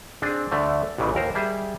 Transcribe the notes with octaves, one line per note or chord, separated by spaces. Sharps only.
C4 D4 G#4
D2 D3 A3
A1 A#2 C#3 E3
D#2 A#4 C5
G3 G#4 E5